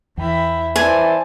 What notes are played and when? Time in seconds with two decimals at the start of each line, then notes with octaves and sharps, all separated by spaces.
0.18 E2 E3 E4 G5
0.76 E3 C4 D5 G#5 A5